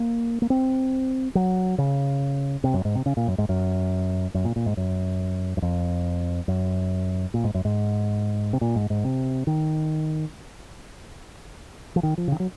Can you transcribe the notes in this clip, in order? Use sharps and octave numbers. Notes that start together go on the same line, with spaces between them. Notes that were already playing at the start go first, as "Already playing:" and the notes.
Already playing: A#3
A#3
C4
F#3
C#3
C3
F#2
G#2
C3
C#3
A#2
F#2
G#2
F#2
F#2
A#2
A#2
G#2
F#2
F#2
F2
F#2
A#2
G#2
F#2
G#2
C3
A#2
G#2
G#2
C3
D#3
F3
D#3
F3
C#3
D#3
F#3